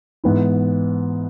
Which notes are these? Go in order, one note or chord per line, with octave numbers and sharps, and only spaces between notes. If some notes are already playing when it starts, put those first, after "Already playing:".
G#2 E3 B3 E4